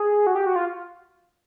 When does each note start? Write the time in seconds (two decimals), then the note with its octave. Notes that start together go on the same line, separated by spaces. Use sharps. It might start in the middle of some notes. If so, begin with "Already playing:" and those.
Already playing: G#4
0.27 F#4
0.35 G4
0.46 F#4
0.56 F4